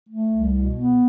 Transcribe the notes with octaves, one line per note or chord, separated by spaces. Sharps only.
A3
C2
B2
B3